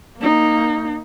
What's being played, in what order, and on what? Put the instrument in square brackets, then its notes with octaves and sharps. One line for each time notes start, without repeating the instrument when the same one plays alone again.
[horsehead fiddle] A#3 D#4